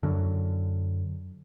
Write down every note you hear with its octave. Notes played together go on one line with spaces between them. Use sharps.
F#2 D3